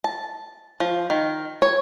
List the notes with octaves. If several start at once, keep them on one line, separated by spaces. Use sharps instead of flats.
A5
F3
D#3
C#5